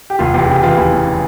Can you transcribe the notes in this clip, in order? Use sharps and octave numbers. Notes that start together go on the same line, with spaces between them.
G4
F1 F4
E2 G4
G#4
C#3 G4
E3 F4
F1 E4
E2
C#3